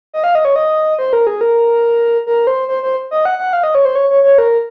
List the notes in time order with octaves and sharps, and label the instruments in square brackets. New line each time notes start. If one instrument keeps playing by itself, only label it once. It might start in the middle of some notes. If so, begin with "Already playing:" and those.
[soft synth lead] D#5
F5
D#5
C#5
D#5
C5
A#4
G#4
A#4
A#4
C5
C5
C5
D#5
F#5
F#5
F5
D#5
C#5
C5
C#5
C#5
C#5
A#4